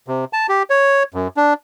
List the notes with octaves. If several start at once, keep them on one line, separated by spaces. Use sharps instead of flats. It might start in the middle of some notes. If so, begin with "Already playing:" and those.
C3
A5
G4
C#5
F#2
D4